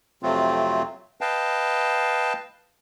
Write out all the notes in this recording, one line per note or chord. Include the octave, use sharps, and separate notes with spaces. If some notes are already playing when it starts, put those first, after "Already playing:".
F2 C3 F#3 A3 C4 F4
B4 D#5 F5 G5 A5